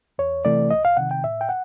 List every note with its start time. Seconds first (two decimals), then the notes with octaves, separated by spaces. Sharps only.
0.18 E2 C#5
0.45 C3 E3 A3 D5
0.71 C2 D#5
0.85 F5
0.97 C3 D#3 F#5
1.11 G5
1.23 A2 E5
1.41 G5
1.49 F#5